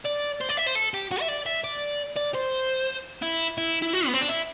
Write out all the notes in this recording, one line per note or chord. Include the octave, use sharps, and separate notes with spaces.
D5
C5
D5
E5
C5
A4
G4
F#4
E5
D5
E5
D5
D5
C5
E4
E4
E4
F#4
B3
C4
D4
E4